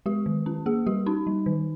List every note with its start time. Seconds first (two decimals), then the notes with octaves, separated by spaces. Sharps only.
0.06 G#3 G4
0.26 D#3
0.46 C#4
0.66 A#3 G#4
0.87 G3 G4
1.06 C#4 D#4
1.27 G3
1.46 D#3